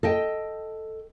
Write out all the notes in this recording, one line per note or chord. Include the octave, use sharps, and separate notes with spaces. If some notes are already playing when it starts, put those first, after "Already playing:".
A4 D#5 G5